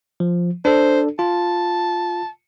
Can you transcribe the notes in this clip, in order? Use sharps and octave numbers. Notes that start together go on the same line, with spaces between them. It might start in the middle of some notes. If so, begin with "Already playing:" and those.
F3
D4 A4 C5
F4 A5